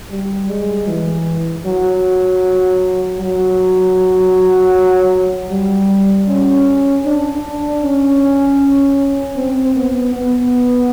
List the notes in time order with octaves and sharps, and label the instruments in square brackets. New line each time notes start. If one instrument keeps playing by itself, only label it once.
[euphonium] G3
G#3
E3
F#3
F#3
G3
C#4
D4
C#4
C4
B3
B3